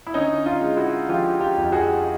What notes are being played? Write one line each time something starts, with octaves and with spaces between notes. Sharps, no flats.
E4
D3 C#4 D#4
D#4 F4
G#3
E4 F#4
F3 F4 G4
F4 G4
F2
F#4 G#4